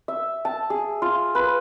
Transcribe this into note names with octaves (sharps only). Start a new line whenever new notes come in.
E5
A5
G#4
F4
B4